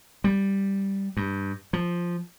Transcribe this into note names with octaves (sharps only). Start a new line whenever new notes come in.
G3
G2
F3